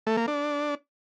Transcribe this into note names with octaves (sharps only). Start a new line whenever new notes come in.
A3
A#3
D4